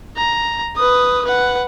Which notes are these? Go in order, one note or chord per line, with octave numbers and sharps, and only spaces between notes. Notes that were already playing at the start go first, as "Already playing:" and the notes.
A#5
B4 D#6
B4 F#5